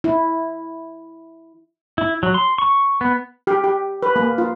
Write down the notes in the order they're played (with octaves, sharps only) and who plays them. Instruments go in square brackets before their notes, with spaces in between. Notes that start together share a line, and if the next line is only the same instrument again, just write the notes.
[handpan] E4
[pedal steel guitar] E4
F#3
C6
C#6
B3
[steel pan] G4
G4
B4
A#3
F4